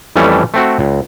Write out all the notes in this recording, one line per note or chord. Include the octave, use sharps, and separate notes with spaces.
F2 E3 G3 A3 C#4
A3 C4 F#4
C#2